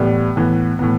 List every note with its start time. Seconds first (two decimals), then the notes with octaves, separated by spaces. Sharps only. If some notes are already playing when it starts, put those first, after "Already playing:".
Already playing: A2 E3 G3 B3
0.36 A2 E3 B3
0.79 A2 E3 B3